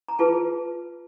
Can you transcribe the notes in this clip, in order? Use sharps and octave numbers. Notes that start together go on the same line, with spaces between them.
A#5
F4 G#4 B4 A5